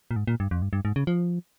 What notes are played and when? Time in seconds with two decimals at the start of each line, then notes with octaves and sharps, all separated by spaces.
0.11 A#2
0.16 G#2
0.27 A#2
0.40 G2
0.51 F2
0.62 G2
0.73 G2
0.85 G#2
0.96 C#3
1.07 F3